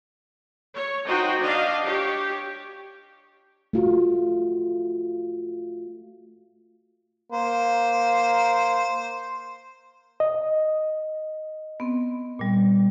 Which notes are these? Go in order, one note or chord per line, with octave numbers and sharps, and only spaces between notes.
C#5
D#4 F#4 C5 G5
D4 D#5 F5
G4 C#5
A3 F4 F#4
A#3 C5
D#5
B3 C4
A#2 G3